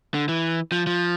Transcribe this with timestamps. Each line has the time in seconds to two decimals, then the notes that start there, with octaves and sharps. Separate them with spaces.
0.14 D3
0.29 E3
0.72 F3
0.87 F3